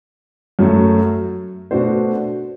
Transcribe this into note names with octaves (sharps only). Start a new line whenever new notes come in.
F#2 F#3 A3
B2 A3 D4 F#4 C5